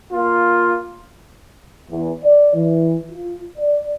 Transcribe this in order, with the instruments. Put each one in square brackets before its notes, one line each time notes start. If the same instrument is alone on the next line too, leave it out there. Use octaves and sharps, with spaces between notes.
[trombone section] A#3 F4
[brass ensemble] E2
D5
E3
F4
D5